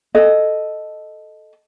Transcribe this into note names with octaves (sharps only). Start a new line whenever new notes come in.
A4 D#5